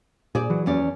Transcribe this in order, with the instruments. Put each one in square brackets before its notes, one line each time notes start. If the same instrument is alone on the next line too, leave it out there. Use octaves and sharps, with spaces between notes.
[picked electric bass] A#2 [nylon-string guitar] G#4 C5 D5
[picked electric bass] E3 F#3
[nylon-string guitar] E2 C#4 D5